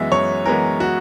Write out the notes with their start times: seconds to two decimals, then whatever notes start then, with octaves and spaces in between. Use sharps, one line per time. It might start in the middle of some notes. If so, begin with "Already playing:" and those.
Already playing: F#2 E3 G#3 B3 E5
0.12 F#2 C#5
0.45 E3 G#3 B3 A#4
0.80 F#4